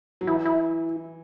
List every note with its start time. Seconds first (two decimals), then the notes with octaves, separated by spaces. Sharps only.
0.21 F#3
0.27 E3 E4
0.45 E4